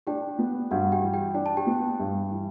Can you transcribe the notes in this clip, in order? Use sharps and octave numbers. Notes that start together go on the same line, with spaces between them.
D4 G4 G5
B3
G2 F#4 F#5
G4 G5
E3
G4 G5
D4 G5
A5
G4 G5
B3
G2
E3